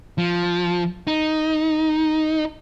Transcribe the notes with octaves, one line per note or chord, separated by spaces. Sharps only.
F3
D#4